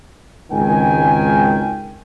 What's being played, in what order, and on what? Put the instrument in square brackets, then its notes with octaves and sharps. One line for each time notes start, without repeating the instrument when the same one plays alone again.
[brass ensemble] G#1 C#2 D#3 G5 G#5